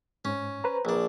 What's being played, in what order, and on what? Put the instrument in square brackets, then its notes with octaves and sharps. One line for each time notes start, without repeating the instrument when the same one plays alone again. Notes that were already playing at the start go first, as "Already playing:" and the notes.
[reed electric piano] G#2 [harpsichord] C#4
[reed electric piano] B4 C5 A#5
[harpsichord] A#1 D4